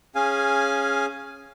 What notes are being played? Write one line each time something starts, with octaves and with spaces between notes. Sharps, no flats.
C#4 G#4 F5 G#5